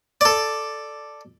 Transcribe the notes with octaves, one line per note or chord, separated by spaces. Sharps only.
A4 D5